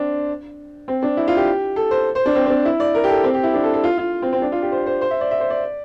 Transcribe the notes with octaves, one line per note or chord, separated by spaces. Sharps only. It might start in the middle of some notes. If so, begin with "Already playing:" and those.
Already playing: C4 D4
C4
D4
E4
F4
G4
A4
C5
C5
D4
C4
C4
D4
E4
D5
A#4
G4
A4
C4
G4
E4
D4
A4
A4
F4
F4
C4
C4
D4
F4
G4
C5
C5
C5
E5
D5
E5
C5
D5